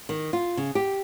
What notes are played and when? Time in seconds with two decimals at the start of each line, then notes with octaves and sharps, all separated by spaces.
0.09 D#3
0.33 F4
0.57 C#3
0.75 G4